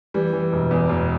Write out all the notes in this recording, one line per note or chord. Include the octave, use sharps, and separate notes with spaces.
E3 G3
E3
E1
E2
E1